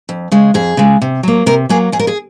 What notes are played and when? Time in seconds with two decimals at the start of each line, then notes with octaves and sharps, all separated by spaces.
0.09 F2
0.32 C#3 G#3
0.54 F2 G#4
0.77 C#3 G#3
1.02 C3
1.23 F#3 A#3
1.46 C3 A#4
1.69 F#3 A#3 G#4
1.92 F2 G#4
1.99 A#4
2.07 G#4